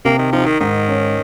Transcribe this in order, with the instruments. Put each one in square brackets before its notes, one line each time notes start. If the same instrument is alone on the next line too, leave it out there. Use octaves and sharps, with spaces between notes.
[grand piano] C3 [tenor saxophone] A#3
[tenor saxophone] D#3
[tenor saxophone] F3 [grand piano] D#4
[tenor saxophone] D#3
[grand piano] G#2 [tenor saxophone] D#3
[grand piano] C#4